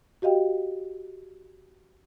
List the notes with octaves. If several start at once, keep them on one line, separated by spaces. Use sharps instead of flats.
F#4 G4 D#5 F5 G5